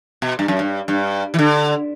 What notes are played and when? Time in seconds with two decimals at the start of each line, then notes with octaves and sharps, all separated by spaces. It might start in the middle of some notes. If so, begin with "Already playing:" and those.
0.22 B2
0.39 G2
0.48 F#2
0.59 G2
0.88 G2
1.34 E3
1.39 D3